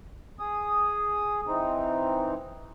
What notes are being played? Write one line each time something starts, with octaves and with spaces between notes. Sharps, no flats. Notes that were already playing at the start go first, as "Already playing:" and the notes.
G#4 D#6
E3 C4 D#4